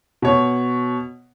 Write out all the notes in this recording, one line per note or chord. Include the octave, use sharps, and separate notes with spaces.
B2 C#5